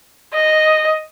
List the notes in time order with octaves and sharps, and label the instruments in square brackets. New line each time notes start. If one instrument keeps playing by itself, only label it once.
[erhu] D#5